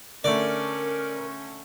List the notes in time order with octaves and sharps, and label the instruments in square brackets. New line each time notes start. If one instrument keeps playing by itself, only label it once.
[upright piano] D3 A3 [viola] C#4 [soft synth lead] A#4 [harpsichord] D5